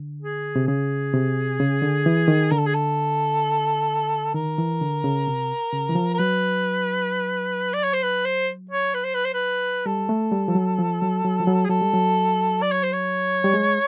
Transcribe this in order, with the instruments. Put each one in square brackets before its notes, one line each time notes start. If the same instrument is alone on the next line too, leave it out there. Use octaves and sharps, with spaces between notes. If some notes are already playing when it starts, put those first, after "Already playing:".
Already playing: [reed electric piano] D3
[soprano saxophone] G#4
[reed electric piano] C3
[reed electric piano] C#3 [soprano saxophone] G#4
[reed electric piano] C3
C#3
D3
E3
D#3
[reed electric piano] D3 [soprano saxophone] A#4
[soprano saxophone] A4
G#4
A4
[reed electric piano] D#3 [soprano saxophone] A#4
[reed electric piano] E3
D3
C#3
C3
C#3
E3
F3
[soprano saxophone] A#4
[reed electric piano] F#3 [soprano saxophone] B4
[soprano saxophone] D5
C#5
C5
B4
C5
C#5
B4
C5
B4
C5
B4
[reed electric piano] G3 [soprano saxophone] A4
[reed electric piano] A3
G3
F3
F#3
F3
F#3
F#3
F3
F#3
[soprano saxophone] G#4
[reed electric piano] F#3 [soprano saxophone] A4
[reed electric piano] G3
F#3
[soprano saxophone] D5
C#5
C5
C#5
[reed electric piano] G3
G#3